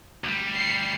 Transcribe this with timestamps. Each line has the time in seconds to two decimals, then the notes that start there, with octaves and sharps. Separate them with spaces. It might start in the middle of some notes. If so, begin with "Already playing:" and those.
0.24 D2 G3
0.56 C7 C#7